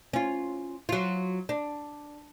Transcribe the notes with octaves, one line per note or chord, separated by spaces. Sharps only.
C#4 F4
F#3 F4
D4